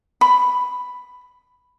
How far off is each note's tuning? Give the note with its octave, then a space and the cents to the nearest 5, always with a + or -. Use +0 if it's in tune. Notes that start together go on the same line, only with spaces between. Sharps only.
B5 +5